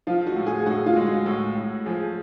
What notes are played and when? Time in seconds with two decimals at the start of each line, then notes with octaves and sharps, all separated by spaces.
0.07 F3 F4
0.27 F#4
0.36 A2
0.46 G#4
0.66 A2 F#4
0.86 F4
0.96 G#3
1.06 F#4
1.26 A2
1.56 A2
1.86 F3 G#4